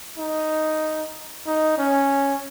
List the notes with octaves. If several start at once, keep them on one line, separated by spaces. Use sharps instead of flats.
D#4
D#4
C#4